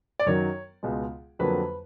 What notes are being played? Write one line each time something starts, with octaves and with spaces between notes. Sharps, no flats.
D5
F#2 D#3 F#3 C#5
C#2 B2 G#3
F2 D3 F#3 A#3 B4